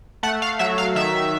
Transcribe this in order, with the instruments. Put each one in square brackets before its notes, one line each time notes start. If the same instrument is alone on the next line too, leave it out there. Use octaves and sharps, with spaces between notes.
[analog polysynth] A3 F#5
F5
F#3 E5
F5
D#3 E5